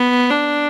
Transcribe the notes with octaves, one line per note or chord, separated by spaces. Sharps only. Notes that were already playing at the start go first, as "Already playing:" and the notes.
Already playing: B3
D4